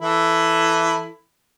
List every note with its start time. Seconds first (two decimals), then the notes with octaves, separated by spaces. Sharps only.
0.01 E3 E4 A4